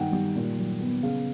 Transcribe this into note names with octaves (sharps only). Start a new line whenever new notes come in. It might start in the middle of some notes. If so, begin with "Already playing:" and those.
Already playing: G2 D#3 F#5 G5
G3
A#2
F#3
B3
C#3 F5